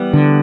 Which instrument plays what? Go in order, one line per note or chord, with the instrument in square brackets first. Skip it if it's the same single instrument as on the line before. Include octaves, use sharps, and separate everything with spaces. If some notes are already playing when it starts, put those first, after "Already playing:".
Already playing: [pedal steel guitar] E3 G3 B3
[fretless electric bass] D3